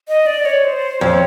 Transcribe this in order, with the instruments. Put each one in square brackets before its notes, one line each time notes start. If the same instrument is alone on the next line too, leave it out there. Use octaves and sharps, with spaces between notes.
[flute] D#5
D5
C#5
C5
[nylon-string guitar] F2 [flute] C#5